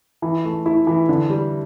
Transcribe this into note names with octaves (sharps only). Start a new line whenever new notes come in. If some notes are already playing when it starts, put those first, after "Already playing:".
E3
A3
E4
E3
D3
G3